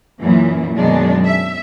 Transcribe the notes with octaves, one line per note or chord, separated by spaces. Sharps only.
F#2 A#2 E3
F#2 B2 D#3 G#3 D4
E5